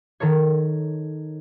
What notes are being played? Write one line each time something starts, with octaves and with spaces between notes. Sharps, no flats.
D#3 A4 A#4 C#5